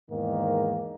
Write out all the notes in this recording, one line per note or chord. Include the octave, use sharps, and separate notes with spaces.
E2 G#2 D#3 A#3